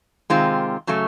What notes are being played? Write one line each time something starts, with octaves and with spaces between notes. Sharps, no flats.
C3 D#3 G#3 C4 F4
C#3 F#3 A3